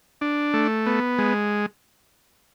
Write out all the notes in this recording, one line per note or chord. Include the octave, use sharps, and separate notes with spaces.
D4
A3
B3
G#3